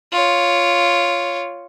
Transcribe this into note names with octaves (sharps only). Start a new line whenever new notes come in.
F4 C#5